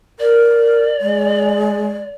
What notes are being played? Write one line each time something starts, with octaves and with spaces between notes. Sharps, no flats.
A#4 D5
G#3